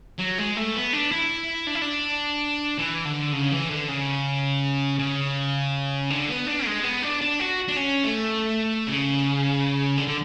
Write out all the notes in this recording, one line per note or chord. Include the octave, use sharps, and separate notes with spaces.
F#3
G#3
A3
B3
D4
E4
D4
E4
D4
E3
D3
C#3
E3
D3
C#3
C#3
D3
B3
D4
G#3
B3
D4
D4
F#4
D4
C#4
A3
C#3
D3
D3